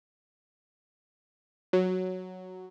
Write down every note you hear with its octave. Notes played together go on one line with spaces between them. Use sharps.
F#3